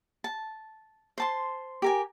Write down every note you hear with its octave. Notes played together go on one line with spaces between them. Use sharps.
A5
C5 A5 C6
G4 A#4 G#5